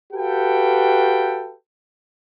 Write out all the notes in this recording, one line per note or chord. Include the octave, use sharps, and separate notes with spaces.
F#4 G4 A4 B4 F5 G5